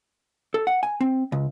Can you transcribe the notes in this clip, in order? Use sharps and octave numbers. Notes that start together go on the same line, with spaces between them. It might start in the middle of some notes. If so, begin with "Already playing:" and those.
A4
F#5
G#5
C4
C#2